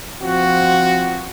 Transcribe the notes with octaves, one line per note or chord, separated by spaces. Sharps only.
F3 C4 F4 F#4